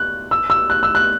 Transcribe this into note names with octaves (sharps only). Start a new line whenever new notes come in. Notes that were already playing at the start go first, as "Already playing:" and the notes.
Already playing: F#6
E6
E6
F#6
E6
F#6